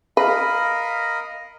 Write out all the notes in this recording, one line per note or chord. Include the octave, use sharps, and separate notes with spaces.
A#4 B4 D#5 F5 B5